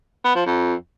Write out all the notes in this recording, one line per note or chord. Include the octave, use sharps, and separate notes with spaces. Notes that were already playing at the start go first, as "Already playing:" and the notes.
B3
F3
F2